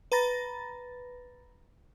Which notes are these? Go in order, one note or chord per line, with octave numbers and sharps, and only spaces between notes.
B4 A#5 B5 A6 A#6